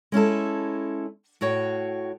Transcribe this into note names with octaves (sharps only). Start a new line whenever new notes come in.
G#3 C#4 E4 A4
A2 F#4 C#5 G5